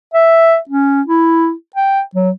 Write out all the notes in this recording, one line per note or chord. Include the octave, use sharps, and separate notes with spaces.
E5
C#4
E4
G5
F#3